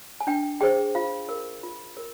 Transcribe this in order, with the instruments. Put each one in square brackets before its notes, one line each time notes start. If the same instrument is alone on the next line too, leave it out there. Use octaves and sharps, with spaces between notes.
[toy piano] G#5
D4 G5
G#4 C5 G5
F4 F5
A#4
F4
A#4